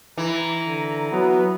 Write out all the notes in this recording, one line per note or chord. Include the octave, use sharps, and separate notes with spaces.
E3 A#5
D3
F#3 B3